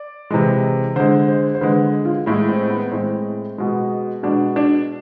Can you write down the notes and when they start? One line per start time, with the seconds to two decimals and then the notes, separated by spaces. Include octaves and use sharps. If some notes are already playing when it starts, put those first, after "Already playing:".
Already playing: D5
0.30 C3 E3 G#3
0.96 D3 G#3 C5
1.28 C5
1.55 C5
1.61 D3 G#3 B4
2.05 F4
2.26 A2 G#3 E4
2.48 C4
2.70 B3
2.91 A2 G#3 C4
3.58 B2 G#3
4.23 B2 G#3 D4
4.56 D4